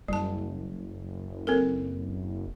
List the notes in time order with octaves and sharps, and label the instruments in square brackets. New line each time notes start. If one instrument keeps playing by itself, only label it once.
[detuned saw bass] F#1 [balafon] G3 A5
[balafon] C4 A4 A#4